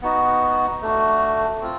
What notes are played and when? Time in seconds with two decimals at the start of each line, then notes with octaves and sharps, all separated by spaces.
0.02 B3 D#4 F#4
0.82 A3 D4 F#4
1.61 C4 F4